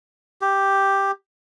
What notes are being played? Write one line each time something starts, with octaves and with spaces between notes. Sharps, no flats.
G4